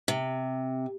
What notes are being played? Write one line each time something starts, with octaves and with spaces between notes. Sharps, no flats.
C3